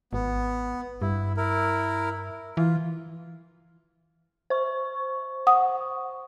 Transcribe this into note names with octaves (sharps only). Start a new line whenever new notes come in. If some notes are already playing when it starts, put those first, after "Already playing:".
G#1 B3
G2 E4
E4 A#4
E3 F4
C5 C#6
F#5 D#6